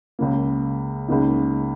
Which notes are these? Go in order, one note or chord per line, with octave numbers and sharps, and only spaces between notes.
C#2 C#3 A#3
C#2 C#3 A#3 D#4